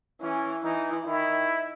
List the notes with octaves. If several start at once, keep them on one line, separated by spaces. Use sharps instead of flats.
E3 C#4
E3 D#4
D#3 E4